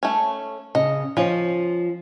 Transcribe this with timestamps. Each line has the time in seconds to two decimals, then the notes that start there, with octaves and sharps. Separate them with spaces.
0.03 A3 C#4
0.75 C#3 D#5
1.17 F3 C#4 F4